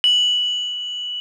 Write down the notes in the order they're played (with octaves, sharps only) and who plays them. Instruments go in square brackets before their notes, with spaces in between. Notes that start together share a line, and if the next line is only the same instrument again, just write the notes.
[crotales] F#7